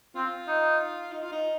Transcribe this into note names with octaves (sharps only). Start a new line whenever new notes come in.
C4 F4
D#4
D#4
F4
D#4